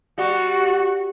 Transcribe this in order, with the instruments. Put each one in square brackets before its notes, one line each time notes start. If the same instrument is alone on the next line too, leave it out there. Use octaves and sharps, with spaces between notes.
[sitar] G3 [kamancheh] F#4